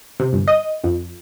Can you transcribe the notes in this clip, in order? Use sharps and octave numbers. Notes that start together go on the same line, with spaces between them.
C3
G1
D#5
F2